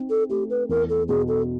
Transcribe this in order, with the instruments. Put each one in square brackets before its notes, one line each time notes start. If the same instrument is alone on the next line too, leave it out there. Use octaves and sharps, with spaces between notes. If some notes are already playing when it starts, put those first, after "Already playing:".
Already playing: [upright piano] C4 D#4
[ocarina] A4
[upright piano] A3 [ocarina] G4
[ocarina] B4
[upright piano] E2 [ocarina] A#4
[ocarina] A4
[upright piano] B2 [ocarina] G#4
[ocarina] A4